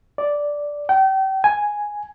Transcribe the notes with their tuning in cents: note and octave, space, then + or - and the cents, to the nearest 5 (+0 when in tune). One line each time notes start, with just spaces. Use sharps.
D5 -5
G5 -35
G#5 +0